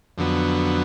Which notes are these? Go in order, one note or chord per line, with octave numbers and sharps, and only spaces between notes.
F2 D3 F#3 B3